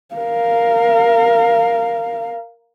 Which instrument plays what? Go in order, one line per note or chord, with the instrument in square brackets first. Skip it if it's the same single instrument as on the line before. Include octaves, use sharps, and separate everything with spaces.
[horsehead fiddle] A#4 F5